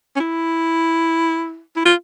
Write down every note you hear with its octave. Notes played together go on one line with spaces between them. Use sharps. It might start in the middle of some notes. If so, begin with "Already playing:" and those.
C#4
E4
E4
F4